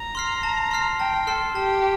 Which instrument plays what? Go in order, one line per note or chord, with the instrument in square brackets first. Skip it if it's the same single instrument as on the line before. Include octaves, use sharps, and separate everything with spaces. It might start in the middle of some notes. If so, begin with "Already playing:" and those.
Already playing: [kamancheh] A#5
[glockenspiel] C6 F6 C7
A5
C6 F6 C7
[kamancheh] G5 [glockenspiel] A5
[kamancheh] A4 [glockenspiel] C6 F6 C7
[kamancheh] G4 [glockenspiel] A5